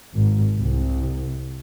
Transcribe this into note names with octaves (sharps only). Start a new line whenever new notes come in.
G#1
C2